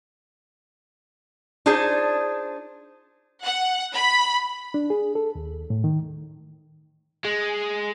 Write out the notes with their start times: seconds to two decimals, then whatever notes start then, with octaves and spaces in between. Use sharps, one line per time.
1.66 D4 D#4 F4 G#4 C5
3.43 F#5
3.94 B5
4.74 D4
4.90 G#4
5.15 A4
5.35 D#2
5.70 A2
5.84 D#3
7.24 G#3